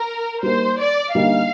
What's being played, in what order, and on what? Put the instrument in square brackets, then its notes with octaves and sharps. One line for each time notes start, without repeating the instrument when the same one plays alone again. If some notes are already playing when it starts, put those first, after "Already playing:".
Already playing: [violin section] A#4
[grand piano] G3 A#3 D#4 A#4 [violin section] C5
[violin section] D5
[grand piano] D3 G3 A#3 D#4 [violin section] F5